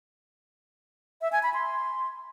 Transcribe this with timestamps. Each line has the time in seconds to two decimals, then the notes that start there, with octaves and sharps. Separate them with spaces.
1.22 E5
1.32 G#5
1.43 B5
1.54 C6